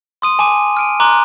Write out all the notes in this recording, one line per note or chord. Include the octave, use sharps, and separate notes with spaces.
C6 D#6 D#7
G#5 A5 D6 D#7
F6 D7 D#7
A#5 C6 D6 F#6